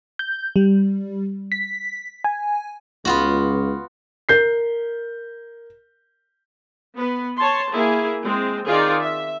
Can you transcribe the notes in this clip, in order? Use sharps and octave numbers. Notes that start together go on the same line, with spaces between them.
G6
G3
B6
G#5
C#2 B3 F4 F#4
A#4 G6 C7
B3 B4
C#5 A5 C6
A#3 E4 G#4
G#3 C4
D#3 C4 D#4 F4 G#4 D5
E5